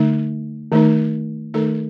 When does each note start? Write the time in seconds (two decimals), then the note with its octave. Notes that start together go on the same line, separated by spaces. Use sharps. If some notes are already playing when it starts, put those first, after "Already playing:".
Already playing: D3 A3 D#4
0.72 D#3 A3 D#4
1.54 D#3 A3 D#4 A4